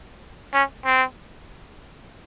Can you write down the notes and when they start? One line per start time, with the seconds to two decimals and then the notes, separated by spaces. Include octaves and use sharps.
0.54 C#4
0.85 C4